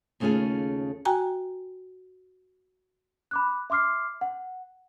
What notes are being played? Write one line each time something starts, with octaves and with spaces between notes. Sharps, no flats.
D#2 C#3 A3 C#4 F4 G#4
F#4 G5 G#5 A#5
B5 D6 F#6
E5 C6 D6 F6 C7
F#5